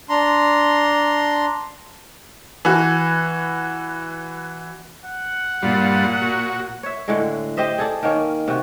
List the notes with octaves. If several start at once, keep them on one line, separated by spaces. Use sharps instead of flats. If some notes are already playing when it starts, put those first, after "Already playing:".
D4 A#5 C6
E3 F#4
F#5
G2 A#2 G3 F4
F#4
C#5 E5
A2 D3 G#3
G4 C5 D#5 E5
G#4 A4 D5
D#3 A#3 C#4
C3 F#4